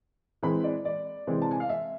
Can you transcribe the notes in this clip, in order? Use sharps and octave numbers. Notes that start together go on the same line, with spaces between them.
E3 G#3 C4 B5
D5
D5
C3 E3 G#3 C4
A5
G#5
F5
E5